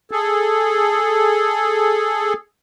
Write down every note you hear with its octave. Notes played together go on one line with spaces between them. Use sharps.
G#4 A4